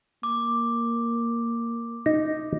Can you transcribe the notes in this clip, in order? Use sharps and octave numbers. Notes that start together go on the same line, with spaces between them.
A#3 D6
D#4 A#6